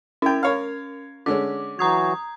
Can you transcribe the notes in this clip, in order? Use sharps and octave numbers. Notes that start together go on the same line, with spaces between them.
C#4 E4 G5 G#6
A#4 C#5 F5
D3 G#3 C#4 D6
E3 F#3 F#4 A#5 D#6 G#6